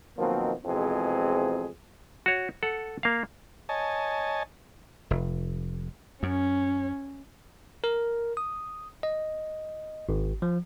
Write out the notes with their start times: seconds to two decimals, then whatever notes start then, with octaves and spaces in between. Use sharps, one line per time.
0.18 B2 D#3 F3 F#3 A#3 C4
0.65 F2 B2 E3 G#3 C4 G#4
2.26 F#4 C#5
2.63 A4 F#5
3.03 A#3 F5
3.69 C#5 D#5 G#5 A5
5.11 F1
6.23 F#2 C#4
7.84 A#4
8.37 D#6
9.03 D#5
10.09 G#1
10.42 F3